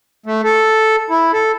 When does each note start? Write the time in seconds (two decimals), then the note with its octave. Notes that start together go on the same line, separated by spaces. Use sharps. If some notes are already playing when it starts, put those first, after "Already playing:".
0.26 A3
0.44 A4
1.10 E4
1.33 A4